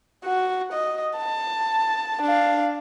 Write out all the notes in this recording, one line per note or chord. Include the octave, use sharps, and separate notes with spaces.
F#4
D#5
A5
D4 F5